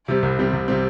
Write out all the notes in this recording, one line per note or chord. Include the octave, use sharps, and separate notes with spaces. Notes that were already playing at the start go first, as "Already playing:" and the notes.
C3 G3 C4
C2
C3 G3 C4
C2
C3 G3 C4